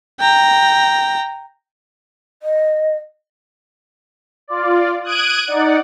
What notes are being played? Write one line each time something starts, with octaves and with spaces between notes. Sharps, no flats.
G5 A#5
D#5
F4 D5
D#6 F#6 G#6 D7 D#7
D#4 D5 F#5